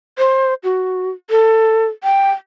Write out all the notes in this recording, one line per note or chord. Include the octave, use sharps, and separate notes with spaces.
C5
F#4
A4
G5